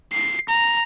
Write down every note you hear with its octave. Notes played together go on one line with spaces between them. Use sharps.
C7
A#5